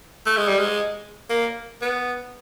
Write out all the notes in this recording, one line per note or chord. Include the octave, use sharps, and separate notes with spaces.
A3
G#3
G3
G#3
A#3
B3